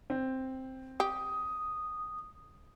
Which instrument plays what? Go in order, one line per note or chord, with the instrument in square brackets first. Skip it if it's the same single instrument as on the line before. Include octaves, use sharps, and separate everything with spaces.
[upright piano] C4
[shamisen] G4 [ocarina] D#6